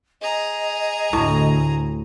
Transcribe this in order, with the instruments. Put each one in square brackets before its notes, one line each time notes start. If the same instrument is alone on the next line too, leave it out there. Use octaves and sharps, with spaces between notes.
[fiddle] G#4 A#5 [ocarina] D#5
[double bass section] D2 [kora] A2